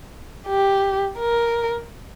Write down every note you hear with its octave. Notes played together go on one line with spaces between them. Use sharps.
G4
A#4